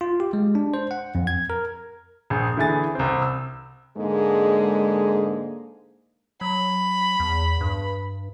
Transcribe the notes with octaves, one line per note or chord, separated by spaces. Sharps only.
F4
G4
G#3
D4
C5
F#5
F2
G#6
A#4
A#1 G#4 G6
D3 E3 E4 G#4 G#5 A6
C2 C4
E6
G#2 D3 G#3 A#3 G#4
F#3 B5
E2
G2